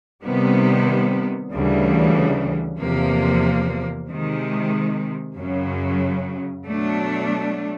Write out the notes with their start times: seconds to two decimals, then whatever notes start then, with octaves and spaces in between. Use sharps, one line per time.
0.23 C3 D#3 G3 B3
1.51 D2 C#3 E3 G3
2.80 E2 C3 F3 A#3
4.08 C3 D#3 G#3
5.37 F#2 C#3 F#3
6.65 B2 F#3 A3 D4